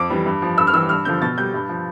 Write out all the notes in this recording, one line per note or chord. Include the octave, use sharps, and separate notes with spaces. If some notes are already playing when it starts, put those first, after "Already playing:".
Already playing: F2 D6
E3 G3
G2
F3
G2 E6
F6
E3 G3 E6
G2 F6
D3 F3 G6
B2 A6
G3 G6
G2
F3